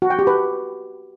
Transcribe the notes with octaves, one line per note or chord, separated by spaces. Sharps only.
F#4
G5
G4
B4